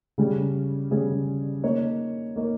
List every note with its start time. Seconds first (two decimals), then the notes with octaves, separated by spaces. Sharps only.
0.18 C#3 G3 C#4 G#4
0.91 C#3 G3 C#4 G#4
1.63 A#3 D#4 A#4 C#5
2.36 A#3 D#4 A#4 C#5